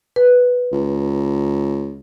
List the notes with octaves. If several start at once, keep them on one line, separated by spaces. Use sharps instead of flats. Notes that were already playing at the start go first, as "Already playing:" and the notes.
B4
C#2